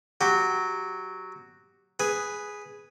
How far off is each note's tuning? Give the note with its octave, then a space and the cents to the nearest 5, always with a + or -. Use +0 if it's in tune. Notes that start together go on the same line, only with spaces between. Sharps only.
F#3 +0 G4 +10
G#4 +0 B4 +0